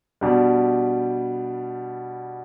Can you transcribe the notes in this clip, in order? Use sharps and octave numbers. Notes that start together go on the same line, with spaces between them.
B2 G3 D4 G4